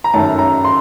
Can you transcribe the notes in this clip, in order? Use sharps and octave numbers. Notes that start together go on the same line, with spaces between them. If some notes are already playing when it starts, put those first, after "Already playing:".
A#5
F#2 D#3 A3 A5
A#5
C6